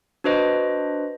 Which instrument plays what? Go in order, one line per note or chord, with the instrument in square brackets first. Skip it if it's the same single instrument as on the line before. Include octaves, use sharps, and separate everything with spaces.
[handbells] D4 F#4 B4 C5 D#5